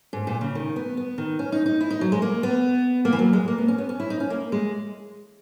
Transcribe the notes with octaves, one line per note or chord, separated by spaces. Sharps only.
G#2
A#2
C#3
D#3
B3
B3
D#3
C#4
D#4
D#4
E4
D#4
F#3
G#3
A#3
B3
A#3
E3
F#3
G#3
A#3
B3
C#4
B3
C#4
E4
D#4
C#4
A#3
G#3